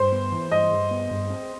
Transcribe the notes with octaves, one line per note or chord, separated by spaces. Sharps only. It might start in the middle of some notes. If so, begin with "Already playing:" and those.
Already playing: G2 C5
B3
E3
G2 D#5
G2
B3
G2
C4